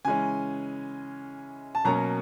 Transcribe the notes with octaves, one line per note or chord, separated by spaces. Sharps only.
C#3 E3 G#3 C#4 G#5
A5
B2 F#3 A#3 C#4 A#5